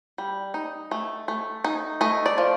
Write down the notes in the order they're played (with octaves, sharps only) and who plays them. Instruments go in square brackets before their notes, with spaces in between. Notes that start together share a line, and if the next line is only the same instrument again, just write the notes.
[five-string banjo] G3
D#4
A3
A3
D#4
A3 D#5
D5
F3